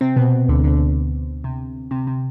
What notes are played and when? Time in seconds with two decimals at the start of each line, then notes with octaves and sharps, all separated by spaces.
0.01 C3 C4
0.16 B2 B3
0.48 D2 D3
0.64 D2 D3
1.44 C3
1.91 C3
2.07 C3